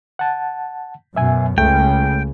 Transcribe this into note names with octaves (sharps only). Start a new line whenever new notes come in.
F#5 A5
F#2 B2 E5 G#5
C#2 C#3 A3 G5